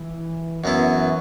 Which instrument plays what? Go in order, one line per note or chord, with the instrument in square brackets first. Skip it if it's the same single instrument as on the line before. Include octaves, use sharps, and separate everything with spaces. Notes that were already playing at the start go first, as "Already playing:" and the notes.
Already playing: [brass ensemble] E3
[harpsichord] F#2 F#3 B3 E4 [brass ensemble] E3